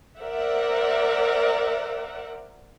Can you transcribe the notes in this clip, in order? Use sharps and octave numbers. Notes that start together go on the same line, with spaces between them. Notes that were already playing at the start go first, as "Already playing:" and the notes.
A#4 C5 D5 E5 F#5